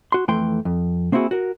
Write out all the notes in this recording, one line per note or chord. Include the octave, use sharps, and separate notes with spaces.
F#4 C6
F2 E3 A3 G5 C6
F2
A#3 C4 D#4 E4 F#4 G#4
F#4 A#4